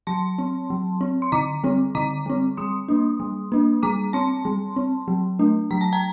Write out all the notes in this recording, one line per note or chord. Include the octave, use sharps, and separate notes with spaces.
F#3 A5 C6
C4
F#3
C4
C6
D3 A#5 D6
G3 C4
D3 A#5 D6
G3 C4
G3 C6 D#6
A#3 D4
G3
A#3 D4
G3 A#5 D6
C4 A5 C6
G3
C4
F#3
A3 D4
F#3 A#5
A5
G5 A#5